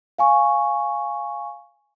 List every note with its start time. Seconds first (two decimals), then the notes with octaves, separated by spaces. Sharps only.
0.19 F5 G#5 C#6